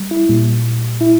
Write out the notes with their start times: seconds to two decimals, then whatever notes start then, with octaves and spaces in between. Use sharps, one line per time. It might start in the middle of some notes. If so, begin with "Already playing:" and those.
Already playing: G3
0.11 E4
0.29 A#2 G3
1.01 E4